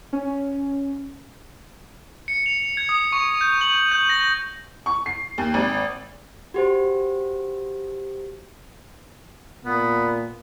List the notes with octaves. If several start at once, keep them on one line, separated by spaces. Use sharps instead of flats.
C#4
C#7
F7
G#6
D#6
C#6
G6
F#7
G6
A#6
A#6
C#6
C7
D#2
G#1
F#4 G4 C5
A#2 B3